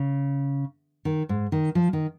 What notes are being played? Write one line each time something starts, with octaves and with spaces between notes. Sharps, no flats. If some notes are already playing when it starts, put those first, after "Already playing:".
Already playing: C#3
D#3
G#2
D#3
F3
D#3